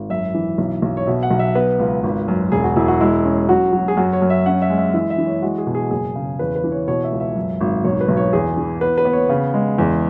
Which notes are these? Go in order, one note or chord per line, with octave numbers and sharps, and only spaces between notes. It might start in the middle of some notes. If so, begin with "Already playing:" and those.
Already playing: G#1
F#2 E5
E3
B1
B1
C#5
B2 E5
F#5
B1
E5
B3 B4
C#2
G#1
F#2
E1 G#4
F#4
E1 E4
F#4
G#3 E4
C#4
F#3 F#4
F#3
G#4
F#2 F#4
C#5
F#2
E5
C#4 F#5
E5
G#3
E5
E3 E5
E5
E3
C#5
G#3 F#4
G#4
B2
G#4
F#1 G#4
C#3
E2 B4
B4
E3
C#5
B2 C#5
E5
C#2
E5
F#2
G#1
B1 C#5
B4
B1
C#5
E2 G#4
E3
B3 B4
B4
B3
C#5
C#3
G#3
E2